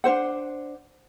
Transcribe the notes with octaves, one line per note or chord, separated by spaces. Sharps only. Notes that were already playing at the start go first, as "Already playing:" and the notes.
D4 F#4 C5 F#5